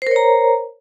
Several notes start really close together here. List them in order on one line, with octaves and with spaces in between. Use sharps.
C5 A#4 C#5 A#5